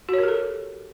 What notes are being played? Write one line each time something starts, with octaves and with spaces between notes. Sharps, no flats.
F#4 G4 A4 A#4 C#5